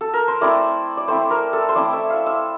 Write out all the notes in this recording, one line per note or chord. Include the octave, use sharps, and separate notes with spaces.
A4
A#4
C5
A3 C4 E4 D5
D5
A3 C4 E4 C5
A#4
A4
C5
A3 C4 E4 D5
E5
F5
E5